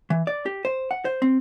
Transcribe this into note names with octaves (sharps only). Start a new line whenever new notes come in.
E3
D5
G4
C5
F#5
C5
C4